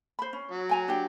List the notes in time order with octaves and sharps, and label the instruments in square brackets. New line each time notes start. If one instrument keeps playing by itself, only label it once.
[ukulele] C5 B5
C#4
[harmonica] F#3
[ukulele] G5 G#5 A#5
D4 G4 G5